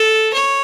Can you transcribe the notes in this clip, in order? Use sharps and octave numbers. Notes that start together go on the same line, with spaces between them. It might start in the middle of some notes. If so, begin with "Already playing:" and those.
Already playing: A4
C#5